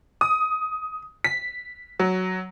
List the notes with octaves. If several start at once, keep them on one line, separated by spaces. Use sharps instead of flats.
D#6
B6
F#3